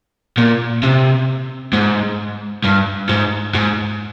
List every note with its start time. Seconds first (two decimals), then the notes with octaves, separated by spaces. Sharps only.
0.37 A#2
0.83 C3
1.73 G#2
2.64 G2
3.09 G#2
3.54 G#2